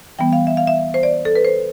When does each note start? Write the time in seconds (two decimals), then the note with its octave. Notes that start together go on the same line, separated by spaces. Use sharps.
0.19 E3 G3 B3 G5
0.33 F5
0.47 E5
0.57 F5
0.67 E5
0.94 C5
1.03 D5
1.25 A4
1.35 B4
1.45 C5